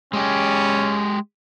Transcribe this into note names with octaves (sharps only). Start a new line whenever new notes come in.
G#3 C#4 G4